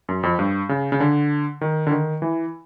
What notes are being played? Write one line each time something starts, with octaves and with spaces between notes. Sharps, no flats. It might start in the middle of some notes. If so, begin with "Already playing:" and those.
F#2
F2
G2
C#3
C#3
D3
D#3
D3
D#3
E3